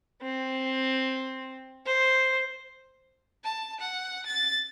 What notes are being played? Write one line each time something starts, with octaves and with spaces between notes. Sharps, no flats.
C4
C5
A5
F#5
A6